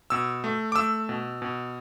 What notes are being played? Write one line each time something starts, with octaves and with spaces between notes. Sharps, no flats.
B2 E6
A3
D6
A3 E6
B2
B2